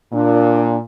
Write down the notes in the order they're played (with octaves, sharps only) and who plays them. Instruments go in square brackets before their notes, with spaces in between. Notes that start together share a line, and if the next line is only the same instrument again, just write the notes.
[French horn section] A#2 [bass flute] D4